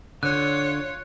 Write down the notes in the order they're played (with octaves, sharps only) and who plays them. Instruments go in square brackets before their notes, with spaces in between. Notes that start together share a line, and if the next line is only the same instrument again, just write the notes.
[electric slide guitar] D3 [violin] F4 C#5 [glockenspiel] F#6